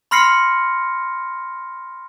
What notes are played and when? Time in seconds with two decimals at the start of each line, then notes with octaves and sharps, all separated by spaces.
0.11 B5 C6 F6 A#6 C7 C#7